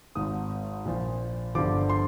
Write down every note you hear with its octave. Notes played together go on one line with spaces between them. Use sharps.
G#1 G#2 D#3 D#6
A#1 A#2 F3
G1 G2 D3 F3 D6
C6